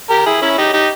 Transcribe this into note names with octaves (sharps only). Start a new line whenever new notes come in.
G4 A#4
E4 G#4
C#4 E4
D#4 G4
D#4 G4